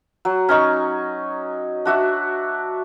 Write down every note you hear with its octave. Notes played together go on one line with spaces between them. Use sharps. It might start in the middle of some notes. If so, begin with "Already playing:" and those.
F#3
C#4 D#4 C#6
D4 F#4 E5